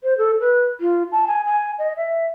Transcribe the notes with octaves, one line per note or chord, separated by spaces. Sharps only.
C5
A4
B4
F4
A5
G#5
G#5
D#5
E5